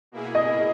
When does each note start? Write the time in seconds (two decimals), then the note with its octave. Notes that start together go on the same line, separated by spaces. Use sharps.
0.12 B2 A#3 E4 G#4
0.35 D#5